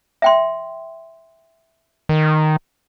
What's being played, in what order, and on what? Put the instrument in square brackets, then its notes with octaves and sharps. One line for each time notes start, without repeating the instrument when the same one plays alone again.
[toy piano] E5 G5 C6
[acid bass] D#3